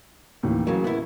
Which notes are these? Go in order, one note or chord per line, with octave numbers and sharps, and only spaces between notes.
D#2 A2 E3
C#3 F#3 A#3
B3 E4